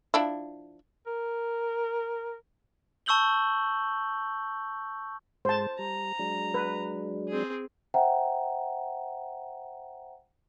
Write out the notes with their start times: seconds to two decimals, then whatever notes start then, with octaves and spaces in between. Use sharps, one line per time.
0.14 F3 D4 E4
1.06 A#4
3.06 A5 C#6 E6 G6 F#7 G7
5.45 G#2 G#3 C5 A5
5.79 G3 A#5
6.19 F#3 G#3 D4
6.54 B4
7.28 C4 G#4
7.94 C5 E5 F#5 G5 A#5